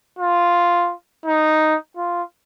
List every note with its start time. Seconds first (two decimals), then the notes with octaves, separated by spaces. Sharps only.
0.19 F4
1.26 D#4
1.97 F4